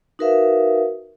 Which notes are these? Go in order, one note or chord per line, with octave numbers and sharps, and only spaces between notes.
D#4 F#4 A#4 B4 E5 F5